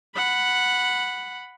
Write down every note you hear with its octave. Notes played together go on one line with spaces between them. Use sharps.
F#5 B5